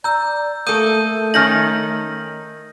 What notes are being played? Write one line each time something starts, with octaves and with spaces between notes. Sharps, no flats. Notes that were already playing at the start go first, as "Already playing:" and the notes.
D5 A#5 E6 G6
A3 A#3 A4 D#6 G6 D#7
D#3 C#4 D#4 F6 G6 A#6 F#7